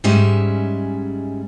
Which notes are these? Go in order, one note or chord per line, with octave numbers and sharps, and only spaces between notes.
G#2 G3 G#3 C#4 E5